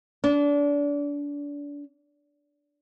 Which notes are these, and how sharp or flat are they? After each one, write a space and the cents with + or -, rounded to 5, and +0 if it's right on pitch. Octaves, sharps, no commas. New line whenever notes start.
D4 -30